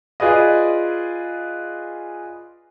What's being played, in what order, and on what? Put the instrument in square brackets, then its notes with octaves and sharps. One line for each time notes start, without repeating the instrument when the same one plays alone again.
[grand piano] F4 G#4 B4 D5 D#5